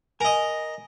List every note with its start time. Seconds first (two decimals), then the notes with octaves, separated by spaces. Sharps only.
0.21 A#4 D#5 G#5